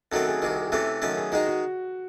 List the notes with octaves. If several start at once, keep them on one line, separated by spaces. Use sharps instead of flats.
F#2 D#3 F#3 A3 C4 A4
G#4
C2 C3 D#3 F#4
G#4
C3 E3 A3 C#4 A4
F#2 D#3 A3 C#4
G#4
D#3 G#3 D#4 F#4
F#4